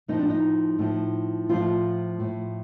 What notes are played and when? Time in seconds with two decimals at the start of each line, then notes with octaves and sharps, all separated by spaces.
0.08 A2 F3 D#4
0.19 D4
0.30 D#4
0.79 A2 F3
1.49 A2 F3 F4
2.20 A2 F3